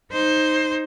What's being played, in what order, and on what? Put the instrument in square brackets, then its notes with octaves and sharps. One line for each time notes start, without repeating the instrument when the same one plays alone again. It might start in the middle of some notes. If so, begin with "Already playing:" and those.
[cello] D#4 C5